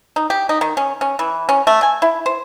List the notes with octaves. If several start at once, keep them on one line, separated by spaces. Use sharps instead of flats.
D#4
G4
D#4
D#3
C#4
C#4
E3
C#4
A3
G#5
E4
C5